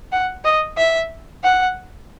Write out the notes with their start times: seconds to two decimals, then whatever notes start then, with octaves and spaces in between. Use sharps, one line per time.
0.12 F#5
0.45 D#5
0.77 E5
1.44 F#5